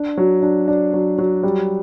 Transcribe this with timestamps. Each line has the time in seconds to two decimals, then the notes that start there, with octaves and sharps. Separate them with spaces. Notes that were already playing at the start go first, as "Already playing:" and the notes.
Already playing: D4
0.17 F#3
0.42 D4
0.68 D4
0.94 F#3
1.18 F#3
1.43 G3